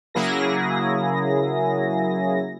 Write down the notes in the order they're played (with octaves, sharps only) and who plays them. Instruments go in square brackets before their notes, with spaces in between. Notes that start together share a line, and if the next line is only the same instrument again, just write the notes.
[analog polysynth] C#3 F#3 A#3 E4 G#4 A#6